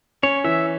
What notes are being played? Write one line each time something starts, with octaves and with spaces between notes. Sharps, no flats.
C#4 C#5
E3 E5